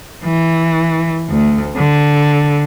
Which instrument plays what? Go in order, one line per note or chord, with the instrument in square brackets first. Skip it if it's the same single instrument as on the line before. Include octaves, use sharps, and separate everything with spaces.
[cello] E3
D2
D3